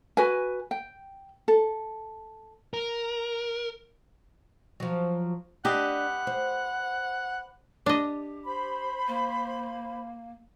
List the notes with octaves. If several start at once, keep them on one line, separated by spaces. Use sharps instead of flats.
F#4 B4 G#5
G5
A4
A#4
F3 F#3
D4 G4 B4 D#5 F#5
C5
D4 G4 D#5
C5 B5
A#3